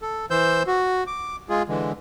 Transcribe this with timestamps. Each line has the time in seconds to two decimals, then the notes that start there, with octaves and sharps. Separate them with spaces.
0.02 A4
0.30 E3 C5 E6 G6
0.67 F#4
1.07 D6
1.49 G#3 F4 G#4
1.69 D3 E3 G#3